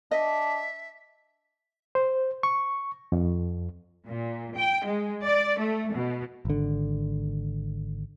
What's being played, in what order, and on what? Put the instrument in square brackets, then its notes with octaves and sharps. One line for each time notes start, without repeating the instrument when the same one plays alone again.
[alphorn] D4 [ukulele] D#5 [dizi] E5
[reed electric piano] C5
C#6
F2
[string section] A#2
G5
G#3
D5
A3
B2
[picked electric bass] G#1 D3